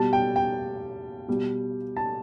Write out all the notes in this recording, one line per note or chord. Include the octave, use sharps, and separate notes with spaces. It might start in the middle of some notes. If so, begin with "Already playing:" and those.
Already playing: B2 G3 A5
G5
G5
B2 G3
A5